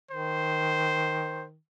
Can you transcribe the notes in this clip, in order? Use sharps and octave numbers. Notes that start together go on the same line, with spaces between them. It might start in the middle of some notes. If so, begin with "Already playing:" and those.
D#3 C5